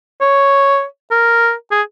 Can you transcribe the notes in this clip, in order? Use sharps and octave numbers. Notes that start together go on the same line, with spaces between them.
C#5
A#4
G#4